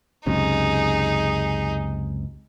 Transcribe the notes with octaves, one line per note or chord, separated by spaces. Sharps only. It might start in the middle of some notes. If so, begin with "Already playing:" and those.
C#2 F#2 C3 D#4 G#4